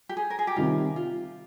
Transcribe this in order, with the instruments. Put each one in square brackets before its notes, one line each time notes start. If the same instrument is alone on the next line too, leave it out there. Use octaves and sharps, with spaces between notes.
[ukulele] G4
G#4
A#4
G#4
G4
[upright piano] C3 D#3 G3 [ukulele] F4
[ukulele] F4